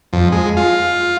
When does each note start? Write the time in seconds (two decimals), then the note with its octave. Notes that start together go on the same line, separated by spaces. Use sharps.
0.13 F2
0.32 G#3
0.57 F4